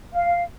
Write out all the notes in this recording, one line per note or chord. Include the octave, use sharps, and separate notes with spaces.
F5